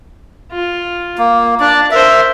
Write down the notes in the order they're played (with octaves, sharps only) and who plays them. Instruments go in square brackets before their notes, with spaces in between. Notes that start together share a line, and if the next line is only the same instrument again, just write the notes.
[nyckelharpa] F4
[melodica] A#3
[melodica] D4 [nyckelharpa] D5
[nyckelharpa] A#4 C5 [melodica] E5